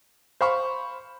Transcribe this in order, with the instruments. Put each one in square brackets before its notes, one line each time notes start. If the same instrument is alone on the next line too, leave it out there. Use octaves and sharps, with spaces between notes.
[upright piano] C5 F5 B5 C#6